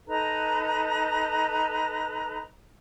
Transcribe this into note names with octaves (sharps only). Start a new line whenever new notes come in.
D#4 A4 B4 A#5